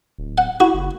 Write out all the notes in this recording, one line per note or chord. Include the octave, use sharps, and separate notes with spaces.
D1
F#5
E4 F#4
F#1